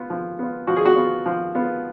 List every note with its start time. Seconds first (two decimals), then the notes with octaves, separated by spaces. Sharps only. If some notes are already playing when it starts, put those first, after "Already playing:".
Already playing: B3 F4
0.10 F3
0.39 B3 F4
0.67 F3 F#4
0.76 G#4
0.85 F#4
0.96 B3 F4
1.26 F3
1.55 B3 F4